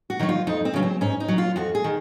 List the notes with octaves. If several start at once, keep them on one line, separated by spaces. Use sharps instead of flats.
F#4
D#3 F#3 D#4
F4
F2 D#4
C4
C#3 F#3 C#4
C4
G#2 C#4
D#4
F#3
F4
F2 F#4
G#4
D#3